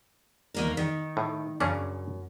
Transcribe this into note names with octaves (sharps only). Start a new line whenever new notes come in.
D#2 A#3 A#4
D#3
A2
F#2 C#3 C#4 D4